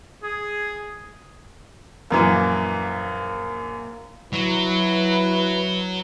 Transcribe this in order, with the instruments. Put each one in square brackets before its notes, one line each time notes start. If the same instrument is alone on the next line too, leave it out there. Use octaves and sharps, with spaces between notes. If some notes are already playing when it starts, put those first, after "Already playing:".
[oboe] G#4
[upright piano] A#1 F#2 E3 [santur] A#3
[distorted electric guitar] F#3 [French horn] E4 [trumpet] B4